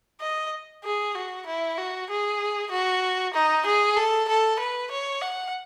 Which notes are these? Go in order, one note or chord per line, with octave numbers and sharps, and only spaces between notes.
D#5
G#4
F#4
E4
F#4
G#4
F#4
D#4
G#4
A4
A4
B4
C#5
F#5